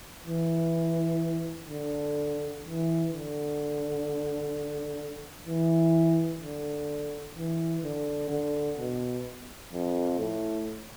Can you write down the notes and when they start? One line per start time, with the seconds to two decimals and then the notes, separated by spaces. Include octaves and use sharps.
0.26 E3
1.68 D3
2.63 E3
3.10 D3
5.46 E3
6.41 D3
7.35 E3
7.83 D3
8.30 D3
8.78 B2
9.72 F2
10.19 A2